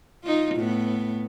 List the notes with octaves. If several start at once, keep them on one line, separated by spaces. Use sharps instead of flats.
D#4 F4
A2 B3